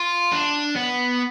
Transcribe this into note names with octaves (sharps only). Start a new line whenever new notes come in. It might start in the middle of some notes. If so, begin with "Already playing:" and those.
Already playing: F4
D4
B3